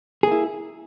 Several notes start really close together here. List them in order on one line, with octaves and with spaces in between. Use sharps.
G#4 A#3 E4